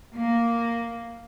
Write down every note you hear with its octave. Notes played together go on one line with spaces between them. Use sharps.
A#3